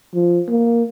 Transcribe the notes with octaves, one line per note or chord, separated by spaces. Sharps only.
F3
A#3